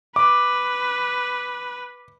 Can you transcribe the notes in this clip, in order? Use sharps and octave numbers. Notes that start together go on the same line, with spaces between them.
B4 D6